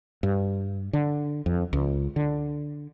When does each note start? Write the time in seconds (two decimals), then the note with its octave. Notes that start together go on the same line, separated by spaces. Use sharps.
0.23 G2
0.93 D3
1.46 F2
1.73 C#2
2.16 D3